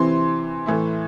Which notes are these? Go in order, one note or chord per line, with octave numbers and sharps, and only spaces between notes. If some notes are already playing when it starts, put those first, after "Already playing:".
Already playing: C3 E3 C4 E4 C6
A2 E3 A3 E4